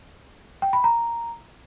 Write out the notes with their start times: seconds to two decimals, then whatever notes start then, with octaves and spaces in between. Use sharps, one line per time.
0.62 G5
0.73 B5
0.84 A#5